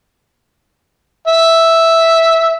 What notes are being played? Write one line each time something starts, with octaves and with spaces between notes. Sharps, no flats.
E5